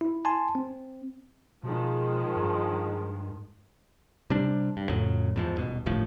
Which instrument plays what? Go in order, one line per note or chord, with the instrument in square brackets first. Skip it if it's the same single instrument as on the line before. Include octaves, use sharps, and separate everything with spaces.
[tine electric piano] E4
G#5 A5 C6
C4
[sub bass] B2 [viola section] D#3 F3 G#3
[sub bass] G2
[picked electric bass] C3 G3 D4
G2
F2 A2 C#3 F#3
E2 G#2 F3
D#1 B2
G1 D#2 A2 F3